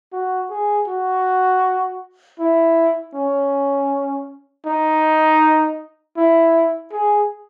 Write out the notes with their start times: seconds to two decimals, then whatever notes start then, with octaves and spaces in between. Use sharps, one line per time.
0.12 F#4
0.50 G#4
0.87 F#4
2.39 E4
3.14 C#4
4.66 D#4
6.17 E4
6.92 G#4